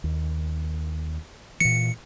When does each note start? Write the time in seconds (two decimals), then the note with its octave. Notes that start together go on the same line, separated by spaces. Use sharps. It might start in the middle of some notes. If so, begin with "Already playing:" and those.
0.04 D#2
1.60 A#2 E3 C#7